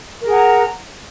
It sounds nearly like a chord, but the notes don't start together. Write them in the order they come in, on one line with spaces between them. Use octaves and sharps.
A#4 G#4 F#5 A#5